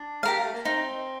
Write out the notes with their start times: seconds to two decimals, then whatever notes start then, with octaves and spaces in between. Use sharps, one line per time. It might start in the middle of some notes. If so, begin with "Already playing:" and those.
Already playing: D4
0.23 G4 A#4 F5
0.42 A3
0.54 A#3
0.65 C4 D#4